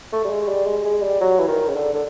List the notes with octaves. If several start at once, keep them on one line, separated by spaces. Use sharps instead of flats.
A3
G3
G#3
G3
G#3
G#3
G3
F#3
E3
D#3
C#3
D3
D3